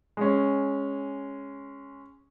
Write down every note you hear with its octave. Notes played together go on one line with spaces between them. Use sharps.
G#3 C#4